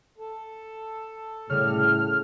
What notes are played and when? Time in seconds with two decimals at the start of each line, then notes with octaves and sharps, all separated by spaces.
0.18 A4
1.50 A2 C#3 G3 F6